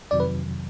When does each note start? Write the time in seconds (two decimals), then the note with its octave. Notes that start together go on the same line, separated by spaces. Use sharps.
0.11 F2 C3 D#3 F#3 D5
0.20 B4